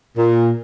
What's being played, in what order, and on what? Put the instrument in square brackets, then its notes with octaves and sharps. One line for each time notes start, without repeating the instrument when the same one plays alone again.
[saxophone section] A#2